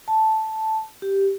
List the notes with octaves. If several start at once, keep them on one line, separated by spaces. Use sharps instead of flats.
A5
G4